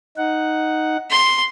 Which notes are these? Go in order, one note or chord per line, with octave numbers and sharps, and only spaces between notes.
D#4 F#5
C6